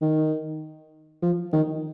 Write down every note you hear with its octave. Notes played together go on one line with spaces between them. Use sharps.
D#3
F3
D#3